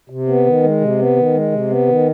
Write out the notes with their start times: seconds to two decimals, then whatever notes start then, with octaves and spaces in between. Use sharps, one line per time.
0.10 C3
0.28 B3
0.46 D#3
0.63 G#3
0.81 C3
0.99 B3
1.16 D#3
1.34 G#3
1.52 C3
1.70 B3
1.87 D#3